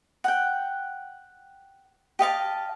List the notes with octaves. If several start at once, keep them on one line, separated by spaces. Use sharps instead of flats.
F#5 G5
G4 D#5 F5 A5